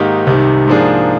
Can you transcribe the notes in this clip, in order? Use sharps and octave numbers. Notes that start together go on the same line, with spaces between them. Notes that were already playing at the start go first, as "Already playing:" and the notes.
Already playing: G#2 D#3 A#3 D#4 G4
C2 C3 D#3
G#2 F3 A#3 D4 G#4